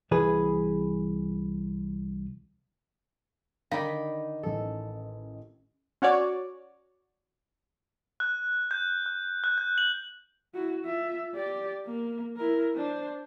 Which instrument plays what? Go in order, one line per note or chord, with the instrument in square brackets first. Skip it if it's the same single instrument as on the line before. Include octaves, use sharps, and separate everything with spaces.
[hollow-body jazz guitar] C2 E3 G#4 B4
[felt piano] D3 [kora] D#3 D5 [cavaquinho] D#4 B5 [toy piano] F5
[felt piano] A1 C#4 D#5 [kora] A4
[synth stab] C#4 F#4 C#5 D5
[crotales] F#6
G6
F#6
F#6
G6
F#7
[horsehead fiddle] E4 F#4
F4 E5
G4 D5
A#3
E4 A#4
D4 C5